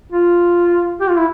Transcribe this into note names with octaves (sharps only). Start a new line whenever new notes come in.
F4
G4
F4
E4